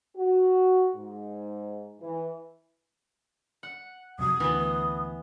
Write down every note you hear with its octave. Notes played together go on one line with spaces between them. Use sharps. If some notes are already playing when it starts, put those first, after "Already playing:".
F#4
G#2
E3
F#5
F2 C3 F#3 D#6
D2 E3 B3